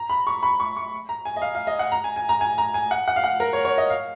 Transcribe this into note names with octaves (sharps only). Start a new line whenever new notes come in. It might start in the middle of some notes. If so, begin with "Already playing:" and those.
Already playing: A#5
B5
C#6
B5
C#6
C#6
A#5
G#5
D#5
F5
F5
D#5
F#5
A#5
G#5
G#5
A#5
G#5
A#5
G#5
F#5
F#5
F5
F#5
A#4
C#5
C#5
D#5
F5